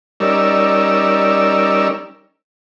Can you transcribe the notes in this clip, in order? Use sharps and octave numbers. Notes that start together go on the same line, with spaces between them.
G3 C#4 D#4 A#4 D5 E6